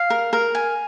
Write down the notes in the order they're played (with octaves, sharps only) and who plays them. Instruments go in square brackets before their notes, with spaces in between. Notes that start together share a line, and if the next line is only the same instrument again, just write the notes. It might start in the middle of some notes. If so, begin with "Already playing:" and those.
Already playing: [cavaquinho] F5
A#4
A#4
G#5